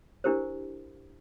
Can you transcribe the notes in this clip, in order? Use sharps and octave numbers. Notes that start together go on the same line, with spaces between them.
D4 E4 G4 A#4 C5